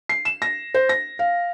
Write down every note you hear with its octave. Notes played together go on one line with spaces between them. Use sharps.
C7
E7
A#6
C5
A#6
F5